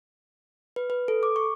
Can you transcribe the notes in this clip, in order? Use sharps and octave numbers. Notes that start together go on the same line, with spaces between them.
B4
B4
A4
D6
C#6